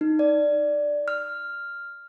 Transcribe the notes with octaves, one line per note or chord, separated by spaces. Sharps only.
D#4
D5
F6